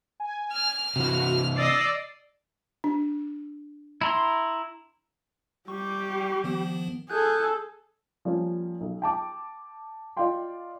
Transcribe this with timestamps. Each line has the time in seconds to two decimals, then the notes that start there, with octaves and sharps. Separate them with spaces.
0.20 G#5
0.52 F6
0.96 C3 E3 F#4
1.56 D5 D#5 E6 A6 C7
2.84 D4
4.01 E4 A#5 C6
5.68 G3 G4 C#6
6.44 D#3 F3 B3
7.10 G#4 A4 F#6 G6
8.25 F3 G3 A#3 C#4
8.81 B1
9.02 G5 A5 D6
10.17 F4 D5 D#5 F5 G5 C6